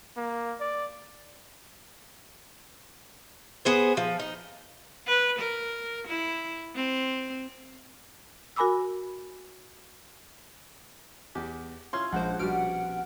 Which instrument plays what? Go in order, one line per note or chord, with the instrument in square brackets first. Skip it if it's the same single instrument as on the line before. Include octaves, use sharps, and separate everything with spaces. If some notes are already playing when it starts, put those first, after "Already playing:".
[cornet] A#3
D5
[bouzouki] B3 G#4 C5
F3
D#4
[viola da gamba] B4
A#4
E4
C4
[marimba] F#4 A#4 G#5 B5 D6 E6
[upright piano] E2 [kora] G4
[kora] C#4 E4 F4 [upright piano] C6 G#6
[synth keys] A#1 G#3 C5 [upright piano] F3 [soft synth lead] F#5
[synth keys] A#1 F6 D7 [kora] B2 G3